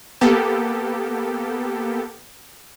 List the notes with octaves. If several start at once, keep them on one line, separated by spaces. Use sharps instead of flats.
A#3 B3 G4 A4